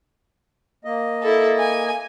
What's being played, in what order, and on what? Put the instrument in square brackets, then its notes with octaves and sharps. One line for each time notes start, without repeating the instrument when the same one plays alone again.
[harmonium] A#3 D#5
[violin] E4 A4
G#5